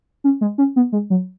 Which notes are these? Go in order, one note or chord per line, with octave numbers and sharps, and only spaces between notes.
C#4
G#3
C#4
B3
G#3
F#3